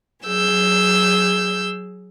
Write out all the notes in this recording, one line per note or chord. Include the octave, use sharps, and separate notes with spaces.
F#3 G#4 E6 G6